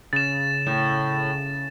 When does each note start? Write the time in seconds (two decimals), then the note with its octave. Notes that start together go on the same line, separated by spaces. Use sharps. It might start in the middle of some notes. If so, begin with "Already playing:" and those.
0.13 C#3 A6 E7
0.67 A2